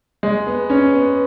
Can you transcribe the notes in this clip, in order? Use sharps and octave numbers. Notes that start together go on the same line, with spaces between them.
G#3
B3
C#4
B3